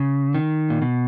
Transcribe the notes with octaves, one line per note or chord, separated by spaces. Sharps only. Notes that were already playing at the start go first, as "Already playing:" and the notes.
Already playing: C#3
D#3
A#2
B2